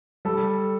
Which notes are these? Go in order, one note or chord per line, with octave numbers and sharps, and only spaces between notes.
G3 A4